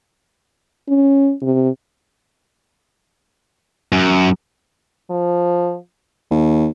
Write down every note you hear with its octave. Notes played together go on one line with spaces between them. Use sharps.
C#4
C3
F#2
F3
D#2